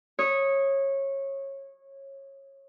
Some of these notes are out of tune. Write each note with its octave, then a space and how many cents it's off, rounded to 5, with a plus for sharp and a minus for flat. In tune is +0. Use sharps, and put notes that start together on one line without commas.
C#5 -20 D#6 +0